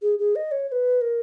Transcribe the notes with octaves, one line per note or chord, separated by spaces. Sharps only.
G#4
G#4
D#5
C#5
C#5
B4
A#4